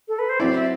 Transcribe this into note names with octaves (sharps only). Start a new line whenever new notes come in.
A4
B4
C5
F#3 C4 E4 D5
E5